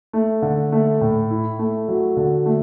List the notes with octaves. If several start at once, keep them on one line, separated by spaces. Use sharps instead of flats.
A3
D3
A3
A2
E4
A3
F#3
D3
A3